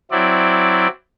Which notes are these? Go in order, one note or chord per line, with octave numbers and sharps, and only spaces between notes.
F#3 C4 E4 D5